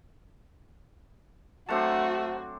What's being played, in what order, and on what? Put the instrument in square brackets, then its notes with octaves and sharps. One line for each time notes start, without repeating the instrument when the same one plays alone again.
[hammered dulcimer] F#3 C4 D4 [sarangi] A3 [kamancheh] F#4 [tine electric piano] C5 F#5 A5